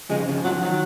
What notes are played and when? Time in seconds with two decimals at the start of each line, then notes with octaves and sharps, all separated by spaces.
0.10 C#3 F3 G#3
0.28 C#3 F3
0.44 C#3 F3 F#3
0.62 D#3 F#3